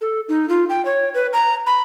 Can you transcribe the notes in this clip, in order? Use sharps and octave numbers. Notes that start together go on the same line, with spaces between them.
A4
D#4
F4
G5
C#5
B4
A#5
B5